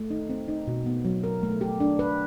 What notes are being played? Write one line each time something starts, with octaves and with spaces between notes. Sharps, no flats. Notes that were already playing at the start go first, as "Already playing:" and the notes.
Already playing: A3
D#4
C4
D#4
B2
B3
F#3
A#4
A3
G4
D4
B4